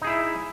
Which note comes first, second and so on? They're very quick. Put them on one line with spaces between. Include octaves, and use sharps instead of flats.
D#4 G#4 E4 E5